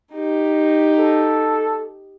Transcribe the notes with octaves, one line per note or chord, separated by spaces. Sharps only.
D#4 G4
A4